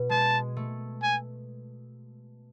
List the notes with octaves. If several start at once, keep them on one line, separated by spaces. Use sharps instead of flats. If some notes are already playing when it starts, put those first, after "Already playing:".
Already playing: B2
G#3 A5
A3
G#5